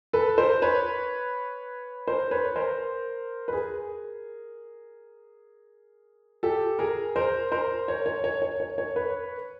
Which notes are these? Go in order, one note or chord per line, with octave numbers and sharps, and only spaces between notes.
A4 B4
A#4 C5
B4 C#5
A#4 C5
B4 C#5
A#4 C5
B4
G#4 A#4
G4 A4
G#4 A#4
A#4 C5
A#4 C5
C#5
C#5
C#5
C#5
C#5
C#5
B4 C#5